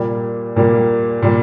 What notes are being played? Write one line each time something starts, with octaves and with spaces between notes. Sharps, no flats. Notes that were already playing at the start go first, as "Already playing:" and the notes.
Already playing: A#2 G3 A#3
A#2 G3 A#3
A#2 G3 A#3